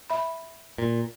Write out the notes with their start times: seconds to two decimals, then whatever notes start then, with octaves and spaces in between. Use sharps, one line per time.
0.10 E5 B5
0.78 A#2